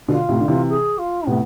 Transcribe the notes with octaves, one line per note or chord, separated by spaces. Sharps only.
B2 D3 F4
A2 C3
D3
C3 E3
G#4
F4
A2 C3 B3